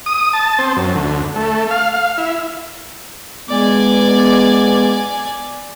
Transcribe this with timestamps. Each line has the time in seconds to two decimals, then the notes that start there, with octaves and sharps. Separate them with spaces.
0.06 D#6
0.33 A5
0.59 C4
0.76 F#2
0.95 D2
1.36 A3
1.70 F5
1.94 F5
2.17 E4
3.50 G#3 B3 D5 G#5